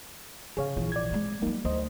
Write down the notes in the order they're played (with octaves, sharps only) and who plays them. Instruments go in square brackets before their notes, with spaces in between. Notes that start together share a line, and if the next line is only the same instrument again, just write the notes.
[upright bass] C#3 [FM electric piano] G#4 C#5 F5
[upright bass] A#1 E3
[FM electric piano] D5 G#6
[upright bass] G#3 C4
[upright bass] F#3 G3 [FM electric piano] A#3 D#4
[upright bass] D2 [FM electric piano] C5 D#5